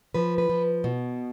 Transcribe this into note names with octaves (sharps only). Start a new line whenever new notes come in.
F3 B4
B4
F3
B2